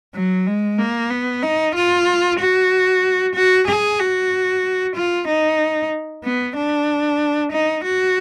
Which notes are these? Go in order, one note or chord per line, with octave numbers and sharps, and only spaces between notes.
F#3
G#3
A#3
B3
D#4
F4
F#4
F#4
G#4
F#4
F4
D#4
B3
D4
D#4
F#4